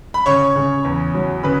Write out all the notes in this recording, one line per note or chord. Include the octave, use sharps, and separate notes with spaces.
B5
C#3 C#5 C#6
C#3
E2
F#3
C#3 B4 B5